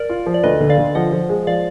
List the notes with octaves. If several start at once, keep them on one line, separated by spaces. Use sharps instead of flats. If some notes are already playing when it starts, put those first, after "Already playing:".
Already playing: A#4 D5
F4
F3
D5
D2 B4 D#5
D3
D5 F5
D3
F3 D#5 F#5
F3
G#3
F3 D5 F5